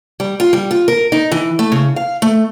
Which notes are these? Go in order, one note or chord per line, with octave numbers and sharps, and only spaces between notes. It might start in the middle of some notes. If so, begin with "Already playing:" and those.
G3
F4
G3
F4
A#4
D#4
E3
A3
C#3
F5
A3